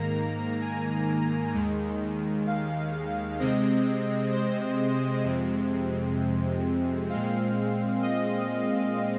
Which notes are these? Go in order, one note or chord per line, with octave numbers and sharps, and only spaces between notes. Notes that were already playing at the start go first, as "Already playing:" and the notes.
Already playing: G#2 D#3 A#3 A#5
G#5
D#2 D#3 G#3
F5
C3 G#3 C4 D#5
C5
F2 C3 G#3 C4
A#2 G#3 C4 F5
D#5